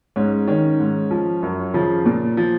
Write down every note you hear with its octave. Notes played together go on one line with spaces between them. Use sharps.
G#2 C#4
D#3 C#4
G#2
F3
F#2
C#3 F3
A#2
F3